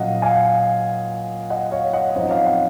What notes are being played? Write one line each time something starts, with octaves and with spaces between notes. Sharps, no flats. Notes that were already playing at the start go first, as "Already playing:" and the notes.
Already playing: A#2 F#3 C#4 D#5 F5 F#5
F5 G#5
D#5 F#5
C#5 F5
D#5 F#5
F#2 F3 C4 D#4 C5 D#5
C#5 F5
D#5 F#5